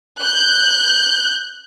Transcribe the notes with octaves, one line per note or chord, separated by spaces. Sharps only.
F#6 G6